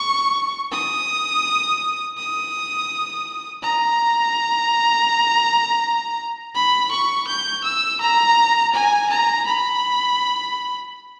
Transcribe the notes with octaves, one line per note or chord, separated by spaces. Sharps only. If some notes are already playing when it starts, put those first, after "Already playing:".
Already playing: C#6
D#6
D#6
A#5
B5
C#6
G6
E6
A#5
G#5
A#5
B5